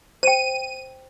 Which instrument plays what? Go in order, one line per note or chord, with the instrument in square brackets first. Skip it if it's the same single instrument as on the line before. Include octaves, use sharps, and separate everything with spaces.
[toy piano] C5 G5 [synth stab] D#7